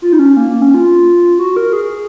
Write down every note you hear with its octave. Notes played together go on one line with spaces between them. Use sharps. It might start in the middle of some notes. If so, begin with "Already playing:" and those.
F4
D#4
C#4
A#3
A#3
C#4
F4
F#4
A#4
G#4